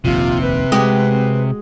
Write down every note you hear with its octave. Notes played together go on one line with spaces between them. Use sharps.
F1 A#1 D#2 C3 F4
B4
G#3 C4 F#4 G4